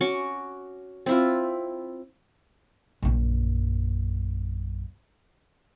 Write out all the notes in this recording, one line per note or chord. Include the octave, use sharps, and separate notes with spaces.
C#4 F#4 C#6 D6
C4 E4 F4
A#1 F#2